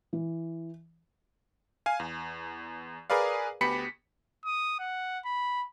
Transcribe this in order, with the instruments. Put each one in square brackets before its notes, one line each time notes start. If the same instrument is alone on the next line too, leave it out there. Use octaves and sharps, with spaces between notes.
[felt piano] E3
[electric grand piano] F5 G#5
E2
G#4 A#4 B4 D5 F5
D2 B3 G4 B5 B6 C#7
[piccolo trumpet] D#6
F#5
B5